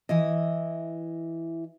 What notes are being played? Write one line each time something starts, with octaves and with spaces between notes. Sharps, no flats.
E3 E4 D#5